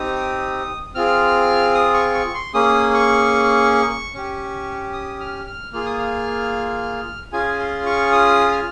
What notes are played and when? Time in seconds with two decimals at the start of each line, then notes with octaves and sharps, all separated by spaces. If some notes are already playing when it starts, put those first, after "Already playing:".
Already playing: C4 D#4 G4 D#6
0.95 C4 F4 G#4 F6
1.74 D#6
1.94 C#6
2.15 C#6
2.34 C6
2.54 A#3 C#4 G#4 D#6
2.94 C#6
4.14 C#4 G4
4.93 D#6
5.20 F6
5.47 F6
5.73 A#3 F4 G#4 F6
5.86 D#6
5.99 F6
7.32 C#4 F4 G#4 G#5
7.59 C6
7.86 C#6
8.12 D#6
8.52 F6